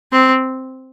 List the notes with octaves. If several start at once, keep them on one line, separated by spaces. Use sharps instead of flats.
C4